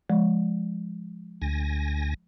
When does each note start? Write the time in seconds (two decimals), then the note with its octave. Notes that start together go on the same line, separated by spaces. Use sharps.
0.09 F3 G#3
1.42 D2 G#5 A#6